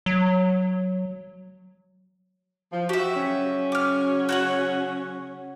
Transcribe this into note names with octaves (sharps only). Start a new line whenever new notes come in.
F#3
F3
F#4 G4 E5
C#3 F#3 C#4
D6 F6
F#4 C#5 F#5